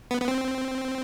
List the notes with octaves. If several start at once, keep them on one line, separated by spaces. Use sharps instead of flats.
B3
B3
C4